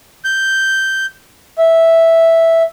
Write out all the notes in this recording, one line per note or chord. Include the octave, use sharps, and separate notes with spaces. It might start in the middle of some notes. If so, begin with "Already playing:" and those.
G6
E5